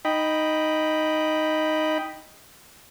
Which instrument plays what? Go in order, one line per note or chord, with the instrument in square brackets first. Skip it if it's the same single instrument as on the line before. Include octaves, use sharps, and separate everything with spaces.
[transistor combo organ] D#4 D#5 G5 B5